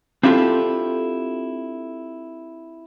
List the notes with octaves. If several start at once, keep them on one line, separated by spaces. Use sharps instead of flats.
C4 D4 E4 F4 G4 A4